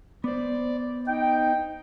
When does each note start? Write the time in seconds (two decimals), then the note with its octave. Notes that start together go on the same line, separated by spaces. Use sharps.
0.24 B3 C5 D5
1.07 D#4 G5